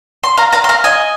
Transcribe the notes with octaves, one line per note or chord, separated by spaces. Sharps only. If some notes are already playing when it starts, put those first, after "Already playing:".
C6
F5 A#5
F5 A#5
C6
F5 A#5
D#5 G#5